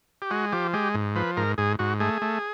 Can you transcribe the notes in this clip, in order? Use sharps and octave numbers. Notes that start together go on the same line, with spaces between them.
G4
G#3 F#4
F3 G4
G#3 G4
G#2
F3 B4
G#2 A#4
G#2 G#4
G#2 F#4
A3 G#4
A3